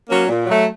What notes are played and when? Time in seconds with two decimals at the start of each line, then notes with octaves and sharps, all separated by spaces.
0.09 F#3 A#3 C#4
0.28 A#2
0.47 F#3 A3